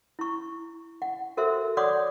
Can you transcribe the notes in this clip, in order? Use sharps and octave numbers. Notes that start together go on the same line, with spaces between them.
E4 C#6
F#5
F#4 A4 A#4 C5 E5
C#5 D5 F#5 C6 D6 D#6